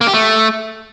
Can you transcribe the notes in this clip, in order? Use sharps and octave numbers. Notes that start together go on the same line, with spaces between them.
A#3
G4
A3